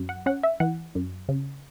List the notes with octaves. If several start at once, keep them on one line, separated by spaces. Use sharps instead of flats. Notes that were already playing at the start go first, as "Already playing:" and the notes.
Already playing: F#2
F#5
C#4 F#5
E5
E3 F#5
F#2
C#3